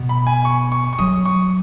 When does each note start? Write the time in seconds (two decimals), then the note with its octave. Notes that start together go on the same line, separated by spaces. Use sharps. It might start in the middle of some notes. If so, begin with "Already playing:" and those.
Already playing: B2
0.09 B5
0.27 G#5
0.45 C#6
0.72 C#6
0.93 C#6
0.99 F#3 D#6
1.25 C#6